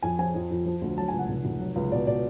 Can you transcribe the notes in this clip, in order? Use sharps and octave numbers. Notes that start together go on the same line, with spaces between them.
F2 G#5
F3 G#5
F2
F2
F3
D2
F#3 A5
G#5
C#2
F#5
F1
F1
F#3
C#2
B2 D5
B2 D5